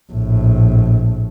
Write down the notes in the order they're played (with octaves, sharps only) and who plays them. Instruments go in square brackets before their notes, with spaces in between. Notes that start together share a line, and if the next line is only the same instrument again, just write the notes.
[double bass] A#1 A2